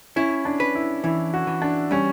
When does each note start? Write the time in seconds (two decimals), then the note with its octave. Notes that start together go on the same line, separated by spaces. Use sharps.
0.16 C#4 E4
0.45 D4
0.60 B4
0.75 E4
1.04 E3 E4
1.34 F#4
1.47 E3
1.62 D4
1.91 G3 C#4